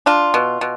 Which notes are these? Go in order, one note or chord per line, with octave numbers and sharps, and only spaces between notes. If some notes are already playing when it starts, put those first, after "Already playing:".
D4 F4
B2
B2